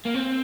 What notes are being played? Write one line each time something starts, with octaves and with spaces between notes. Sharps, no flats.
A#3
C4